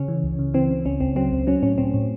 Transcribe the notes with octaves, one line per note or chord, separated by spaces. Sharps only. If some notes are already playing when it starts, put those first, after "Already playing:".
Already playing: C#3 C#4
E3
C#2
C#3
E3 C4
C#3
C#2 C#4
C#2 C4
F#3 C4
C#2
F#3 C#4
A2 C#4
A2 C4
A2